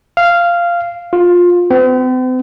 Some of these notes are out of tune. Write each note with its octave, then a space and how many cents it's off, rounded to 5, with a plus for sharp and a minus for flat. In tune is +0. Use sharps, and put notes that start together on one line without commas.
F5 -10
F4 +20
C4 -45